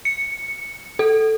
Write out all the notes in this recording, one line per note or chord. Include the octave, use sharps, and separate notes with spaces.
C#7
A4